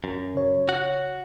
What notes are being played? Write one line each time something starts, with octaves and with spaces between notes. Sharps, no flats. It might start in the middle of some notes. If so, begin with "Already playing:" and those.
F#2
C#3 C#5
F#4 F#5